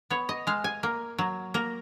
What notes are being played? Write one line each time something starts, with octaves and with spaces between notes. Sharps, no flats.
B3 C#5
D#5
G#3 F5
G#5
A#3
F#3
A#3 A#5